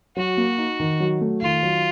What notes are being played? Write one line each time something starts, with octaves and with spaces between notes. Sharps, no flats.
F#3 F#4
A#3
D#4
D#3
F#3
A3
D#3 F4
F#3